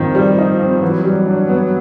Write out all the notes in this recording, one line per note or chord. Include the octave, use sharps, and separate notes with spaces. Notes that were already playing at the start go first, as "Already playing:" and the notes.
Already playing: D#3 F3 C4
G3
D#4
C4
E3 F#3
G3
D4
B3